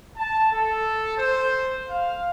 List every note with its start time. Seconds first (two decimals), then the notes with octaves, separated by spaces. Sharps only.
0.17 A5
0.53 A4
1.18 C5
1.89 F5